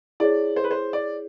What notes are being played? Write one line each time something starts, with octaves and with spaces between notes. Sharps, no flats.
E4 G#4 C#5 D5
C5
B4
C5
D5